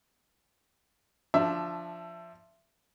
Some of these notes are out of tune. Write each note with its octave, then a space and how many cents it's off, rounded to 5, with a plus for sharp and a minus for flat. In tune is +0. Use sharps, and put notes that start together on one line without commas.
F3 +0 D4 +0 E5 +20